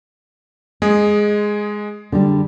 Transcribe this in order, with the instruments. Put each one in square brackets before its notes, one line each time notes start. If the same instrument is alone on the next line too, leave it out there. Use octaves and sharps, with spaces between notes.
[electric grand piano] G#3 G#4 [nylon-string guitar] D#5
[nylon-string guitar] D3 G3